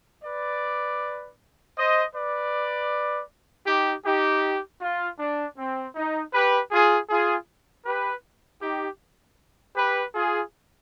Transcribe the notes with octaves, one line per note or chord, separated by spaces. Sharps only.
B4 D5
C5 D#5
B4 D5
D#4 G4
D#4 G4
F4
D4
C4
D#4
G4 B4
F4 G#4
F4 G#4
G4 B4
D#4 G4
G4 B4
F4 G#4